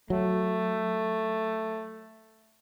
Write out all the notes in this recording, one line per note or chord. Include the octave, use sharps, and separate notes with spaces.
F#3 A3